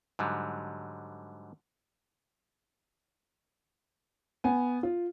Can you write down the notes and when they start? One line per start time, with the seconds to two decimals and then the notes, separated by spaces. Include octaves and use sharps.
0.19 G#2 D3 F#3 G3
4.44 B3 G#5
4.83 F4